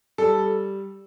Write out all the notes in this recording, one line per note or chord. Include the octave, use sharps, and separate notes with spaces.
G3 A4